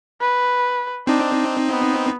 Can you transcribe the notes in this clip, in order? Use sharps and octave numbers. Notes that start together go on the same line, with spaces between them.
B4
C4 D4 D#4
B3